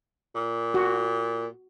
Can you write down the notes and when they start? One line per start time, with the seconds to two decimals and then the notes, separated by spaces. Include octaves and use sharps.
0.35 A#2
0.74 F#4